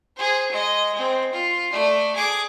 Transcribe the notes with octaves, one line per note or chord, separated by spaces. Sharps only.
G#4 C5
G#3 D#5
G#3 C4
F4
A3 D5
G#4 D6